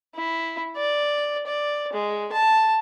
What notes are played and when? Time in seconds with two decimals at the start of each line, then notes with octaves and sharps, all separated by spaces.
0.14 E4
0.76 D5
1.46 D5
1.93 G#3
2.32 A5